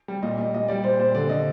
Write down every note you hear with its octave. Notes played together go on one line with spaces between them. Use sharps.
G3
A#2 D#5
A#2 D#5
A#2 D#5
G3 D5
A#2 C5
A#2 C5
D3 D5
D3 D#5